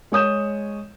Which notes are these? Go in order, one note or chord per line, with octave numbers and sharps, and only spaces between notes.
G#3 C#5 D#6 G6 E7